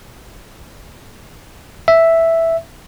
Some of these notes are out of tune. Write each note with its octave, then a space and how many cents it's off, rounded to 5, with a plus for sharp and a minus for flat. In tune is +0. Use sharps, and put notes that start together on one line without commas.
E5 +0